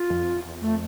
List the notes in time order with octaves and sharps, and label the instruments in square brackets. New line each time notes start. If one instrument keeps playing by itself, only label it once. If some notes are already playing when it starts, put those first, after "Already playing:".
Already playing: [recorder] F4
[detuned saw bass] F2
E2
[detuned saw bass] F2 [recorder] A3